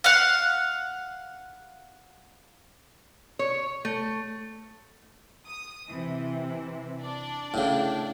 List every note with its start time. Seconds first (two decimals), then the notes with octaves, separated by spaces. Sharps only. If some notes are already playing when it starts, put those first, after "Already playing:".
0.04 F5 F#5
3.39 C#5
3.85 A3
5.46 D#6
5.89 C3 E3
7.01 D4 D5
7.54 A2 C#3